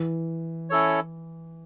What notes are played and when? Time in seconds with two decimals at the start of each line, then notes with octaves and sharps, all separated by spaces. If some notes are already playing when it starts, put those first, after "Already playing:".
Already playing: E3
0.70 C#4 E4 A4 C#5